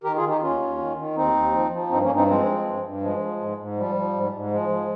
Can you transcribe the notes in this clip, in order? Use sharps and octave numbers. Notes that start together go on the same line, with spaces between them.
D#3 G4 A#4
F4 G#4
D#3
D#4 G4
D#2 C#4 F4
D#2
D#3
D#3
D#2 C4 D#4
D#2
F3
F3
G2 C4 D#4
A#3 C#4
G2
C4 D#4
F3 G#3 C4
F3
G2
G2
F3 G#3
F3
G#2
G#2
F3 G3
F3
G#2
G#2
F3 G#3
F3